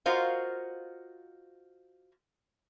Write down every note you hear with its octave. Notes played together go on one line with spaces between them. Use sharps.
F4 F#4 A#4 C5 D#5 F5